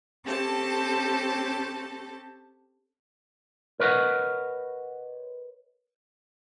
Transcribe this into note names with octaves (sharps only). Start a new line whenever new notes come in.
C4 C#4 G4 A4 A5
A#4 B4 C#5 D#5 F#5